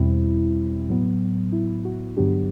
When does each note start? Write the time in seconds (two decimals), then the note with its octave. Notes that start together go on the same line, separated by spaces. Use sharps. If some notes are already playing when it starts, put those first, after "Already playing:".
Already playing: E2 B2 G3 C4 E4
0.89 A2 F#3 B3
1.52 E4
1.85 F#4
2.16 G2 D3 F#3 B3 D4 G4